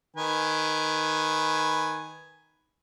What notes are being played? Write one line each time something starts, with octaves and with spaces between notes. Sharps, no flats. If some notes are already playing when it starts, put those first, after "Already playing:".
D#3 B4 G#5